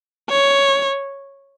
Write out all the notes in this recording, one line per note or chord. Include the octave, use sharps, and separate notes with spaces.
C#5